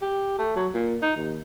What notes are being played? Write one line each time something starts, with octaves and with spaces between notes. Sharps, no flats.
G4
A3
F#3
A#2
D#4
D#2